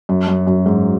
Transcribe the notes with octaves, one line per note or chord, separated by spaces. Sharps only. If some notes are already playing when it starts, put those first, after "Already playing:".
F#2
F#2
F#2
G#2